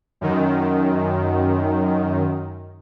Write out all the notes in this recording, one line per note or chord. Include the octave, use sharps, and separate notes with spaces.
F#2 D#3